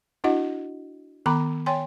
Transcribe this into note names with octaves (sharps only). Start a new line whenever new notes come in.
D4 E4 F#4 D#5 F#5
D#3 B3 A#5 B5 D6
C#5 G5 G#5 C6